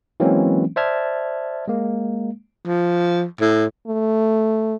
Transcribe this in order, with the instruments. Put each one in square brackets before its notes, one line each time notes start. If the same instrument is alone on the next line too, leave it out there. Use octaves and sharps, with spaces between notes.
[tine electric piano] E3 F#3 G#3 A#3 C4 C#4
C5 D5 E5 A5 F6 G#6
G#3 A#3
[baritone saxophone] F3
A2
[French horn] A3